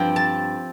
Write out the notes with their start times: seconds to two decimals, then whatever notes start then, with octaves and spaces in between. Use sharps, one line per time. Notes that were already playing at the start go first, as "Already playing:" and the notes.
Already playing: G2 F3 C4 G5
0.16 A5